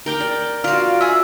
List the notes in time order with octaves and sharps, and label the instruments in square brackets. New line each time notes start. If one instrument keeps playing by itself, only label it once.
[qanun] A#4 G5 D6
D5
[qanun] F4 F#4 [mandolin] D5 F5
[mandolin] G#4 E5